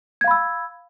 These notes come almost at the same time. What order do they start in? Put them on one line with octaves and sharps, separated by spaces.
G#6 F5 B5 E6